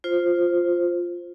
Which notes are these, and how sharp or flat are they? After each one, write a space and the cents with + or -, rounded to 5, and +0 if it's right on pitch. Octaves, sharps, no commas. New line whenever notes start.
F4 +0 C5 +0